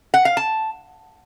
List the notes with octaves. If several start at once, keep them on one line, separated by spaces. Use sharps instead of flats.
F#5
F5
A5